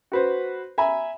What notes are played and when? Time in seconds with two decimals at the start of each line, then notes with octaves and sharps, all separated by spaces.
0.12 F#4 B4 C5
0.78 E5 G#5 A#5 B5